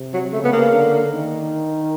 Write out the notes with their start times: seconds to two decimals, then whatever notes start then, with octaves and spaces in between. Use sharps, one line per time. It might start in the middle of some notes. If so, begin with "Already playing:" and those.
Already playing: C3
0.14 F#3
0.33 C#3 A3
0.44 B3
0.52 A#3
0.73 D3
1.12 D#3